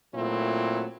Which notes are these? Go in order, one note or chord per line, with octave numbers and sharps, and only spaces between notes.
A#2 F#3 A3 C4 E4